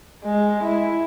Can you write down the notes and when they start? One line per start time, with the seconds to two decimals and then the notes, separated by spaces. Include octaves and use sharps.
0.25 G#3
0.64 E4